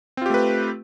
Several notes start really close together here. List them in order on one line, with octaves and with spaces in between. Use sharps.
C4 F4 G4 A3 B4